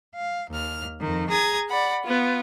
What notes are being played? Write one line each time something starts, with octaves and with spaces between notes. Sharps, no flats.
F5
D#2 F6
F2 D#3
G#4 A#5 D#6 G#6
D5 F#5 B5
B3 F4